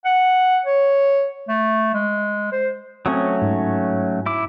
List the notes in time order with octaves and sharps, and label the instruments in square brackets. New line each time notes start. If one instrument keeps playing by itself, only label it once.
[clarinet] F#5
C#5
A3
G#3
C5
[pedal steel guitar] F#3 A3 C#4 [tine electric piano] C4 C#6 D#6
[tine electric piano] G#2
[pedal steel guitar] E4 D6